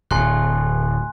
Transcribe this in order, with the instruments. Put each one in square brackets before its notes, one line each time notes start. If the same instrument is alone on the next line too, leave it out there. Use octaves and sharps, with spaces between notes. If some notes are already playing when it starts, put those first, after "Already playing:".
[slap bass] D1 A2 [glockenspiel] G#5 C6 F#6